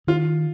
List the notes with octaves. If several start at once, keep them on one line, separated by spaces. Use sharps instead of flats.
D#3 F4